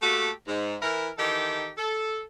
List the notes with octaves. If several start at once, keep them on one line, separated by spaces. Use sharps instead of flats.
A3 A#3 F#4 G4 A4
G#2
E3 E4 A#4
D#3 E3 D#4 G4 A4
A4